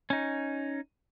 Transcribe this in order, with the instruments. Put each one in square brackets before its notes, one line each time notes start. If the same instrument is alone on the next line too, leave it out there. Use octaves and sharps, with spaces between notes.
[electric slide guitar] C#4 D#4